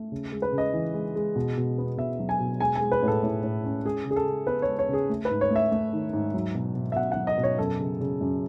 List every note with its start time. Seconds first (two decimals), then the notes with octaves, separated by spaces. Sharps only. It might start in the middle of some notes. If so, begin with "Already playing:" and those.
Already playing: A3
0.12 C#3
0.32 G#3
0.42 B4
0.53 C#3
0.58 D#5
0.73 E3
0.94 G#3
1.16 G#3
1.36 B2
1.57 B2
1.78 B3
1.98 B2 E5
2.20 F#3
2.29 G#5
2.40 B2
2.60 G#3 G#5
2.76 G#5
2.81 G#3
2.92 B4
3.03 A2 A4
3.23 A2
3.43 A2
3.65 C#4
3.85 G#3 G#4
4.05 C#3
4.11 G#4
4.16 A4
4.27 C#3
4.47 B3 B4
4.62 C#5
4.67 G#3
4.79 C#5
4.88 C#3
4.93 G#4
5.09 A3
5.25 G#2 B4
5.41 C#5
5.51 A3
5.56 E5
5.72 A3
5.93 D#3
6.13 G#2
6.34 F#3
6.55 B2
6.75 B2
6.92 E5
6.96 B2 F#5
7.12 F#3 F#5
7.27 D#5
7.38 B2
7.43 C#5
7.58 F#2 A4
7.80 C#3
8.01 C#3
8.21 F#2